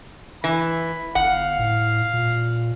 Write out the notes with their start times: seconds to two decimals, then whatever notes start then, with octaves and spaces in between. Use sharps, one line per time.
0.44 E3 B5
1.15 G1 F5 F#5
1.59 A2
2.13 A#2